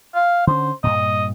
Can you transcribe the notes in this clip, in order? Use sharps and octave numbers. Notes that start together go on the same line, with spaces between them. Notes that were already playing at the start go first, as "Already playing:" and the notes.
F5
D3 C#4 C5
G2 A#2 D#5